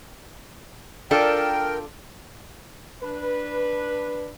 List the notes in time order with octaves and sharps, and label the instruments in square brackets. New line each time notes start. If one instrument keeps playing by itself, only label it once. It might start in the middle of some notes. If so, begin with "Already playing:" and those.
[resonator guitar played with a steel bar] D4 F4 A4 [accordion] A#4 G5
[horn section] D4 B4